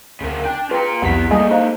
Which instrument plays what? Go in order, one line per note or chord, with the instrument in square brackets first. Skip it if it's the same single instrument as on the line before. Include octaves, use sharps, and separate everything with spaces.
[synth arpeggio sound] D2 [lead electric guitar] C#3 A#4
[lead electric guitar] D4 [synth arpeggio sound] G5
[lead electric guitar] F4 A#5 [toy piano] G#4 B4
[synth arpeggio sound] C2 F2 B6 [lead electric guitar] B3 E4 [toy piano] G4 F#5
[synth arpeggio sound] G3 G#4 D#5 [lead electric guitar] A#3 A4
[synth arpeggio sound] D#4 [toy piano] C5 F5